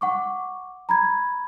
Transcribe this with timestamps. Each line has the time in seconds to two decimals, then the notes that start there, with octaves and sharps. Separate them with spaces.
0.01 F#5 C#6 D6
0.89 A#5 B5 G#6